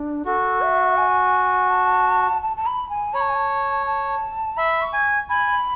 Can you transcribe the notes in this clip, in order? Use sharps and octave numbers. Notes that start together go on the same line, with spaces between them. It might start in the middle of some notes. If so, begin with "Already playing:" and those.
Already playing: D4
F#4 A4
E5
G#5
A5
A5
A5
B5
G#5
C#5 B5
A5
G#5
A5
A5
E5 B5
C#6
G#5
G#5 B5